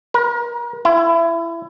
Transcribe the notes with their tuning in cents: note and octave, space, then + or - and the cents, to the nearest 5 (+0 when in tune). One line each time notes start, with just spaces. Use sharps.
A#4 +35
E4 +25